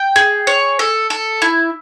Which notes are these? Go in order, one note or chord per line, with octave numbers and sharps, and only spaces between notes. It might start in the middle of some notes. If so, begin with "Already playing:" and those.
Already playing: G5
G#4
C#5
A4
A4
E4